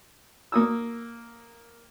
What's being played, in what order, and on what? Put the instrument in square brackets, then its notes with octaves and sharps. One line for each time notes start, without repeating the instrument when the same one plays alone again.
[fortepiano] A#3 D#6 E6